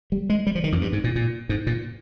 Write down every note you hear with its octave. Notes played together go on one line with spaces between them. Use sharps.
G3
G#3
G3
F3
D#3
F2
G2
G#2
A#2
A#2
G#2
A#2